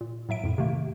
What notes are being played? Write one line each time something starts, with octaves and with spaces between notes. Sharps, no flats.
A#2
A2 F#3 E5 D7
F2 A2
C3 D#3 A3 A#3